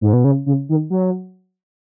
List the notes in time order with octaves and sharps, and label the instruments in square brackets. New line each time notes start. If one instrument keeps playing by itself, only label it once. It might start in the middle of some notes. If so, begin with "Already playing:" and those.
[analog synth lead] G#2
B2
C#3
C#3
D#3
F#3